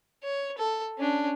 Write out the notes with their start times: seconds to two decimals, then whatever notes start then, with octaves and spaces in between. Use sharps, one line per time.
0.23 C#5
0.58 A4
0.98 C#4 D4